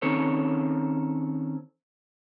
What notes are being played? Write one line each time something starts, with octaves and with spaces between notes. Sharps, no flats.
D#3 C4 C#4 A4 C#5